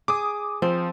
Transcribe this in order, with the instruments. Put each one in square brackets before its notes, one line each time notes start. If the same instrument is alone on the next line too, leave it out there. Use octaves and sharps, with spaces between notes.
[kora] G#4 [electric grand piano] D6 D#6
[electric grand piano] F3 [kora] C4